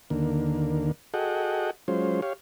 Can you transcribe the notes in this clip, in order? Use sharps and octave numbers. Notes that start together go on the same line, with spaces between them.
D#2 D3 A#3
F#4 G#4 A4 D#5 F#5 G5
F#3 G#3 C#4 F4 C5
G4 C#5 F5